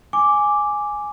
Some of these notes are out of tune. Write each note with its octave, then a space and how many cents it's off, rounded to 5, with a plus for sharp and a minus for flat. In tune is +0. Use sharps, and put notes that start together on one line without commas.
G#5 +0 D6 +0